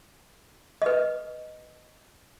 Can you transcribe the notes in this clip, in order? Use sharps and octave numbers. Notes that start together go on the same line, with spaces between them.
B4 D#5